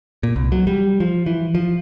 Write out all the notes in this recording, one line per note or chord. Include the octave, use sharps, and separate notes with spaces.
A#2
C2
F#3
G3
F3
E3
F3